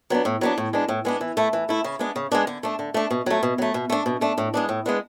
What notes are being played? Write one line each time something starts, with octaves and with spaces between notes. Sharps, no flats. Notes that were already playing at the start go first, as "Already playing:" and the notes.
F#3 B3 D4
A2
F#3 B3 D4
A2
G#3 B3 D4
A2
G#3 B3 D4
E3
A3 E4
E3
A3 E4
C#3
G#3 B3 D4
C#3
G#3 B3 D4
D3
A3 D4
D3
A3 D4
B2
F#3 A3
B2
F#3 A3
B2
A3 D4
B2
A3 D4
A2
G#3 B3 D4
A2
G#3 B3 D4